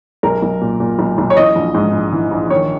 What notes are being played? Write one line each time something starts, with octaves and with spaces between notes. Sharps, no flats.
B1 A#4
B1
A#2
A#2
B1
B1
C#5
E3 D#5
A#1
G#2
A#1
E3
A#1
D#3 C#5